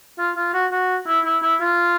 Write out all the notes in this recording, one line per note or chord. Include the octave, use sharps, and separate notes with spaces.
F4
F4
F#4
F#4
E4
E4
E4
F4